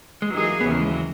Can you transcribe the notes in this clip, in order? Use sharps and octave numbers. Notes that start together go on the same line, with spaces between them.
G#3
E3 F#3 A#3 D#4 G#4
D#2 C#3 E3 B3
A#3
G#3
F#3